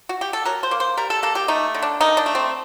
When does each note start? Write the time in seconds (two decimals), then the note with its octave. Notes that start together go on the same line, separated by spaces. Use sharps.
0.09 F#4
0.21 G4
0.33 A4
0.45 F#3 A#4
0.63 C5
0.71 A#3
0.80 C5
0.97 G3 A#4
1.10 A4
1.23 A#3 A4
1.35 G4
1.48 A3 D#4
1.75 D3
1.82 D4
2.00 D#3 D#4
2.17 D4
2.26 A3
2.35 C4